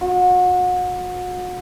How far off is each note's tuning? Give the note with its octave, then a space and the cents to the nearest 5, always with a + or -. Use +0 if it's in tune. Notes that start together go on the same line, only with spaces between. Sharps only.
F#4 -35